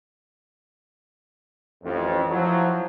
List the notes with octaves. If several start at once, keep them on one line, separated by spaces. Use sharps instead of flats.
A1 F2
F3 F#3 E4